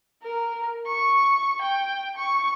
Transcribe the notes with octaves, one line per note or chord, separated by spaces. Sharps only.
A#4
C#6
G5
C#6